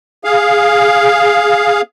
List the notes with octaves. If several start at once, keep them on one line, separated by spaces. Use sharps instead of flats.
G#4 F5